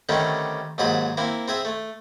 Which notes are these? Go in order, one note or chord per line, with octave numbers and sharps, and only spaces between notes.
D3 D#3 G3 A3 C4 C#4
D#2 G#2 F#3 G#4 C5 B5
A#3 C4 E4
C4 G#4 E5
A3